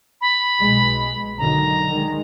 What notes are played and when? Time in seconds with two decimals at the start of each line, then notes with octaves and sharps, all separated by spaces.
0.21 B5
0.59 B1 G#3
1.38 D3 D#3 F#3 A#5
1.91 D#3 G#3